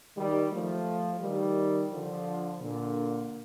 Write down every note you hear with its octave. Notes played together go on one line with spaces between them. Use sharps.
D#3 G3
F3 A3
D#3 G3
D3 F3
A#2 D3